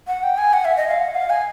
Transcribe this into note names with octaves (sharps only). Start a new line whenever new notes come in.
F#5
G5
G#5
F#5
E5
D#5
F5
F#5
F5
G#5